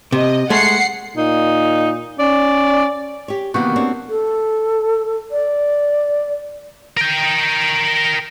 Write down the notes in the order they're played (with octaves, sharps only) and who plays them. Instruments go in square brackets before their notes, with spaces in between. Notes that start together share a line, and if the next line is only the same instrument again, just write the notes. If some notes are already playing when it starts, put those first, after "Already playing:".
[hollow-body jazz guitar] C3 [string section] D#5
[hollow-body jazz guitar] G#3 A3 [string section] F#5 C7 C#7
[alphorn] A#2 [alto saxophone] D#4
[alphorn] C#4 [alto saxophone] D5
[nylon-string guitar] G4 C#5
[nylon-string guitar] C3 D#3 E3 [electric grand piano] A#3 B3 G4 [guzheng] F#4
[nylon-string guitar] C4 D4 C#5
[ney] A4
D5
[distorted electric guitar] A#4 G5